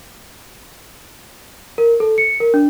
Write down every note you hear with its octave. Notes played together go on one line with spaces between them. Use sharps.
A#4
A4
C#7
A#4
D4